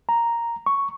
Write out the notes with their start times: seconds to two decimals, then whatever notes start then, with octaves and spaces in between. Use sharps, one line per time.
0.09 A#5
0.66 C#6